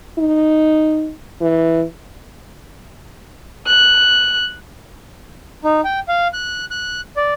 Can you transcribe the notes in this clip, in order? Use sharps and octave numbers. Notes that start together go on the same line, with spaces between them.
D#4
E3
F#6
D#4
G5
F5
F#6
F#6
D5